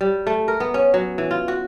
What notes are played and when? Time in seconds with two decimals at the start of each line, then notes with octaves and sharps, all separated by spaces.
0.01 G3
0.27 A3
0.48 A#4
0.60 B3
0.74 C#4
0.94 F#3
1.18 E3
1.31 F4
1.48 F#4